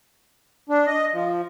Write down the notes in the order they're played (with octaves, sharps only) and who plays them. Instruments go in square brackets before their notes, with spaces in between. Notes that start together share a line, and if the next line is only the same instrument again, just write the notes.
[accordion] D4
D#5
F3